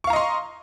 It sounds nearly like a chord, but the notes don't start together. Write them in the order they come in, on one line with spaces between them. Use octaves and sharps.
C#6 F5 A#5 D#5 C6